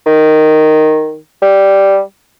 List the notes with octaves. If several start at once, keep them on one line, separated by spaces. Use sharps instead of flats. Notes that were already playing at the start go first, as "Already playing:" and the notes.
D#3
G3